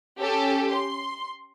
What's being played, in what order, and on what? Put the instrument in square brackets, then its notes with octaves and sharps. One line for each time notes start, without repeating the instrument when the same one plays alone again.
[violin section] C#4 G4 A4
C6